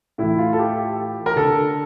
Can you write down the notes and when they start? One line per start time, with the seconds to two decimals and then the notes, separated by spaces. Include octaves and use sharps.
0.18 A2 E3 E4
0.38 F4
0.53 A4
0.59 G4
1.26 A#4
1.36 D3 A4